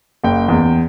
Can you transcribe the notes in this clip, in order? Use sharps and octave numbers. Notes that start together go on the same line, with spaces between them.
F#1 G5
E2